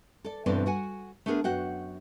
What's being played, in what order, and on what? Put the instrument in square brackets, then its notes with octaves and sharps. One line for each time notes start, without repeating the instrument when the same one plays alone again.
[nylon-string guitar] A4 D5
G2 B2 E3 C4 A4 D5
F#4 F#5 G#5
A3 B3 D4 G#4 A#4
F#2 F#4 F#5 G5